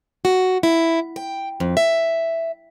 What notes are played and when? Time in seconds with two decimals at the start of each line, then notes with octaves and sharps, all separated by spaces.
0.25 F#4
0.63 E4
1.16 G5
1.60 F2
1.77 E5